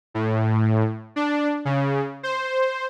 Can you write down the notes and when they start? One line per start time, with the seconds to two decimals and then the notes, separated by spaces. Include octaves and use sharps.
0.14 A2
1.16 D4
1.65 C#3
2.23 C5